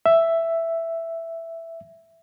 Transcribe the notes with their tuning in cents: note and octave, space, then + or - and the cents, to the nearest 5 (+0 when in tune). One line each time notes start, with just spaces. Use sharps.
E5 +5